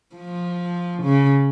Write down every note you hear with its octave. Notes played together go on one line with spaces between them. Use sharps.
F3
C#3